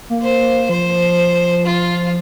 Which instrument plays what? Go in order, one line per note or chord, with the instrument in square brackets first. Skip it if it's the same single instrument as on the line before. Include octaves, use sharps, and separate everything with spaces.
[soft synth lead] A#3
[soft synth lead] A#3 [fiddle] C5
[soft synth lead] F3 [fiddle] C5
[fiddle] F4